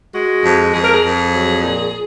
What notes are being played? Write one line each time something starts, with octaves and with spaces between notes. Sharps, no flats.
G#3 F#4
F2
F2 G#4
A#4
G#4
F2
F#3
A#2